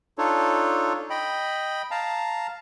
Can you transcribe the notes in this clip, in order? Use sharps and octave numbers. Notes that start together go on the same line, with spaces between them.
D4 D#4 F4 A4 C#5
D#5 G5 B5
F5 A5 A#5